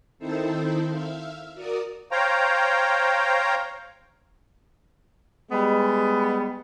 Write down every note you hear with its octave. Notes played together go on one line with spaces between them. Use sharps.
D#3 C4 D#4 E4 A4 C5
E5 F5
F#4 A#4 D5 D#6
C5 C#5 F5 G5 A#5
G3 G#3 B3